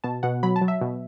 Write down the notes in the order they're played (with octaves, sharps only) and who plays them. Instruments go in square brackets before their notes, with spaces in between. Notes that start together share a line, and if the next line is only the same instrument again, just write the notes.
[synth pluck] B2 A5
B2 F#5
F#3 B5
A5
F#3
E5
B2